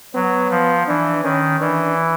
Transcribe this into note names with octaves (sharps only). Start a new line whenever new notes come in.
F#3 B3
F3
E3 D4
D#3 C#4
E3 D4